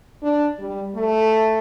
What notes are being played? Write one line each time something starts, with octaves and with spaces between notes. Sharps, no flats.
D4
G3
A3